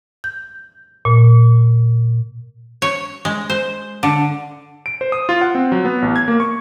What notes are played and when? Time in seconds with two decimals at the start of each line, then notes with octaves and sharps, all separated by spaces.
0.24 G6
1.05 A#2
2.82 C#5
3.25 G#3
3.50 C5
4.03 D3
4.86 D7
5.01 C5
5.12 D#6
5.29 F4
5.41 F#5
5.55 C4
5.72 F#3
5.85 B3
6.02 A1
6.16 G#6
6.28 A#3
6.40 C#6